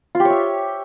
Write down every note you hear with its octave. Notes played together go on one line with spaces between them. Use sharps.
F4
G4
C#5
E5